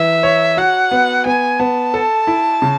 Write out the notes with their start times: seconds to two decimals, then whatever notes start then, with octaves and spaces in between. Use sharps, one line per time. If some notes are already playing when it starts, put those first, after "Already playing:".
Already playing: E3 E5
0.23 C#5
0.57 F#4 F#5
0.91 B3
1.26 B3 G#5
1.59 B3 A5
1.94 A4
2.27 E4
2.62 C#3